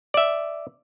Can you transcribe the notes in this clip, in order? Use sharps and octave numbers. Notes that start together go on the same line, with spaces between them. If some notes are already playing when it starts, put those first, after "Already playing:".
D5 E5